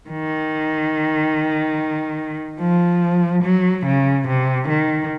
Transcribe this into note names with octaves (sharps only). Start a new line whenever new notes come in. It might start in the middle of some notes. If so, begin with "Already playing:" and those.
D#3
F3
F#3
C#3
C3
D#3